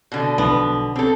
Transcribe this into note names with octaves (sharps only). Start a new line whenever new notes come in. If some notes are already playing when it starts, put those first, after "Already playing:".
B2 D3
B1 F3 B3 D4
C4 A4